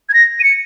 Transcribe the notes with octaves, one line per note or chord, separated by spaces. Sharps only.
G#6
A#6
D#7
C#7